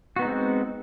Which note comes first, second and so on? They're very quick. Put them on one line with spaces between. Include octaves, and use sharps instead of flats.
F#4 B3 D#4 G#3 C4